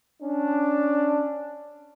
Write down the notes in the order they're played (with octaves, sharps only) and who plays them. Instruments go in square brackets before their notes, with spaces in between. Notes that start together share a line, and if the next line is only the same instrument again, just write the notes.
[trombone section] C#4 D4